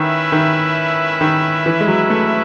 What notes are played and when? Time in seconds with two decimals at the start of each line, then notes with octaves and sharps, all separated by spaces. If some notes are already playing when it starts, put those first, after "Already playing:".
Already playing: D#3 C#4 E4 B4 E5
0.32 D#3
1.21 D#3
1.66 E3
1.81 G#3
1.88 F#3
2.10 A3